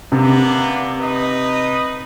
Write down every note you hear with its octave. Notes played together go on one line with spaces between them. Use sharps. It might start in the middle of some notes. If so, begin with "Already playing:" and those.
C3 A#3 B3 D4
D#4 B4 D#5